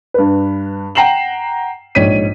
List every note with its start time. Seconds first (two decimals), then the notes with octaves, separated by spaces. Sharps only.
0.14 G2 B4
0.95 F#5 G5 A#5 C7 E7 F#7
1.95 A#1 G#2 C#5 B6 D#7